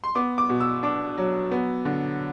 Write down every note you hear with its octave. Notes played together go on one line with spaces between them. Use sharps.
C6
B3 D6
D6
B2
E6
D4 D6
F#3
B3
D3